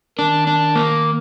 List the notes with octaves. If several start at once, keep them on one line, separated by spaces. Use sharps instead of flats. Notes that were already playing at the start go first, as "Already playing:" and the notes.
D#3 D4
D4
A#3